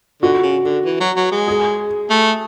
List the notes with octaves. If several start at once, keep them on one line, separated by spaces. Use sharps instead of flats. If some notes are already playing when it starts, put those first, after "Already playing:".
D3 F#4
C#3
D3
E3
F#3
F#3
G#3
G#4
A3